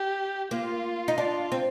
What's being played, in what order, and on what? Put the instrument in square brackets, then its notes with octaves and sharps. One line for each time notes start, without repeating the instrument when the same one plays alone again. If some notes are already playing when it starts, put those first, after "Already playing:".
Already playing: [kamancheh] G4
[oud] A#3 [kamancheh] F4
[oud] D#4
[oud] D4 [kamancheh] F4
[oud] C4